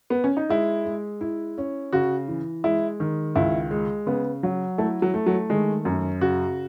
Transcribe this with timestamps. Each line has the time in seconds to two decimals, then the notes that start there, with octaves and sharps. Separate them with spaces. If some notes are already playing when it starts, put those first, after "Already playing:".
0.10 B3
0.24 C#4
0.37 D#4
0.49 G#3 E4
0.85 G#3
1.21 E4
1.58 C#4
1.93 C#3 F#4
2.28 E3
2.64 G#3 E4
3.00 D#3
3.36 C#2 E4
3.71 G#3
4.06 C#3 B3
4.43 F#3
4.78 A3 E4
5.02 F#3
5.14 A3
5.26 F#3
5.50 D#3 G#3
5.85 F#2
6.21 C#3 F#4